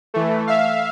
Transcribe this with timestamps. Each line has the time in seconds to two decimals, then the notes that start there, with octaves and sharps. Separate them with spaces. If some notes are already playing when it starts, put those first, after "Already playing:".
0.14 E3 A3
0.47 E5 F5